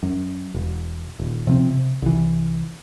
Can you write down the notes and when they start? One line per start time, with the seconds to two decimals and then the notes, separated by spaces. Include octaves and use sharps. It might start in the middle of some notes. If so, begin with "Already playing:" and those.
0.03 F#2
0.54 E1
1.19 D#1
1.47 C3 F3 A#3 C4
1.70 C3
2.02 C2 E3